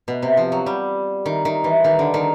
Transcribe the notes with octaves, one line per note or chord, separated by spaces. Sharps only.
B2
C3
F3
F#3
G3
D#3
D#3
E3
D#3
D3
D#3